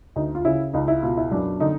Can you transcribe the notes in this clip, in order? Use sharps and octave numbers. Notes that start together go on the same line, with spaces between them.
D2 D#4
F4
C#3 E4
C#2 D#4
E4
B2 F4
E4
F#2 D4
D3 D#4